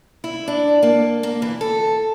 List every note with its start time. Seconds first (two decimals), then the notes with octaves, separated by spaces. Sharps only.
0.24 E4
0.48 D4
0.83 A#3
1.23 A#3
1.42 E3
1.61 A4